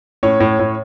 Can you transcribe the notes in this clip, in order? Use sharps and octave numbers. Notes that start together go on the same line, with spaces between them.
A2 C#4 C#5
A2
A2